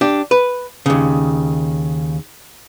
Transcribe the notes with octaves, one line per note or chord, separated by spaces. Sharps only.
D4 G4
B4
D#2 C#3